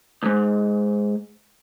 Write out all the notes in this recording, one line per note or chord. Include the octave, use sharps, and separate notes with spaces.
C#2 G#2